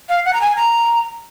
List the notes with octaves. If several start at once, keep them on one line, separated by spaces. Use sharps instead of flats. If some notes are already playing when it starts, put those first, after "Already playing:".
F5
F#5
A#5
G#5
A#5